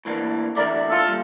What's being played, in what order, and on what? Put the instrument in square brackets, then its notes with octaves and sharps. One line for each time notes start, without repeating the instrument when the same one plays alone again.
[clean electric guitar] A2 E3 A#3 D4
[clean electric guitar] E2 D3 A3 E4 [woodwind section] A#4 D5
[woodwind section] F4 A4
[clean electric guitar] A#2 G3